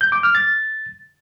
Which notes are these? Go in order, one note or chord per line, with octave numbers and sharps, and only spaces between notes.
G6
D6
F6
A6